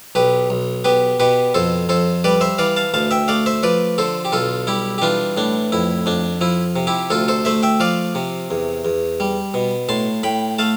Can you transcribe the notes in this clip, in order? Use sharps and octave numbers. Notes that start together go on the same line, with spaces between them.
B1 G4 B4
B1
B3 G4 B4
B2 G4 B4
F2 A4 C5
F2 A4 C5
G3 B4 D5
C5 E5
E3 D5 F5
F5 A5
D2 F5 A5
E5 G5
A3 D5 F5
C5 E5
F3 B4 D5
D3 A4 C5
G4
B1 F4 A4
G3 E4 G4
G4
E3 D4 F4
A2 D4
F2 E4
F2 D4
F3 E4
C3
E4 G4
D2 F4 A4
A4 C5
A3 C5 E5
E5 G5
F3 D5 F5
C3
E2
E2
G3
B2
A2 A5 C6
A2 G5 B5
A3 F5 A5